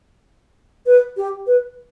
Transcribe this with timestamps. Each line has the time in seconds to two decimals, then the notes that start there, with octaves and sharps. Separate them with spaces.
0.86 B4
1.17 G4
1.47 B4